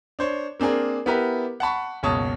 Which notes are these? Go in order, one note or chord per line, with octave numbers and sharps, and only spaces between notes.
D4 C5 C#5
A#3 C4 D4 G#4 A#4
B3 E4 G4 A#4 B4
F#5 A5 B5 C#6
F#1 C#2 B2 C#5 A5 D#6